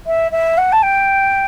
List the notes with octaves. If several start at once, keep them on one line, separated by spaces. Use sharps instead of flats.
E5
E5
F#5
A5
G5